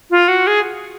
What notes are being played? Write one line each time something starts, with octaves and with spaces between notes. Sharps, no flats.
F4
F#4
G#4